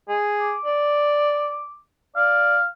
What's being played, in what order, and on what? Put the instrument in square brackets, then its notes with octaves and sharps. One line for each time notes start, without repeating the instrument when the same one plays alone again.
[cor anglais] G#4
[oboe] D6
[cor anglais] D5
[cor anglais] D5 [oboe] F5